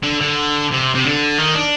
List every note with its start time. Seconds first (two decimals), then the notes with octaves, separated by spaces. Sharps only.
0.03 D3
0.21 D3
0.71 C3
0.95 C3
1.05 D3
1.38 D#3
1.55 D4